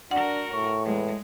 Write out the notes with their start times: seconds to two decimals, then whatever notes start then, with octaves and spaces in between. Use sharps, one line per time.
0.11 D4 F#4 A#4 F#5
0.51 A2 C#6
0.85 E2 G#3